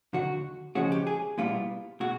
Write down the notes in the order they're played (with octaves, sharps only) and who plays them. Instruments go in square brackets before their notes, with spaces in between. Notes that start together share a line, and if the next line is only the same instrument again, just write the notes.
[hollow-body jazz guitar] D#2 D3 F#3 F#4
C#3 F3 G#3 C#4 F#4
G4
G#4
B1 A#2 G3 B3 E4 F4
B2 G#3 F#4